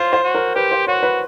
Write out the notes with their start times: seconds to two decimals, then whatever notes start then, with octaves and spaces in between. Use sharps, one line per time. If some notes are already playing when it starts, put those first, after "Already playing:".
Already playing: F4 C5
0.13 C5
0.24 F#4
0.35 A#4
0.55 G4 B4
0.72 C5
0.87 F#4 C#5
1.03 B4